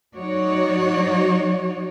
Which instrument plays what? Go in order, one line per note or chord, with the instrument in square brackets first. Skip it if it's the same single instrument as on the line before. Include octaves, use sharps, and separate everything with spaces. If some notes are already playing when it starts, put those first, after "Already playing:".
[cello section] F#3 D#4 F#4 C#5 D5